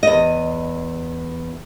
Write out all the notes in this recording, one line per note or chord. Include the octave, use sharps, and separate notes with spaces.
E2 D#5